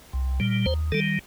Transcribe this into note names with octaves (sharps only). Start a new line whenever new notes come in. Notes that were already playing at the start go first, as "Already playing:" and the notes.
C2
A#2 G3
D#2 C5
D#3 G3 A4